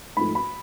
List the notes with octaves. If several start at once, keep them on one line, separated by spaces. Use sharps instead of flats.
G#2 F3 A3 B5
B5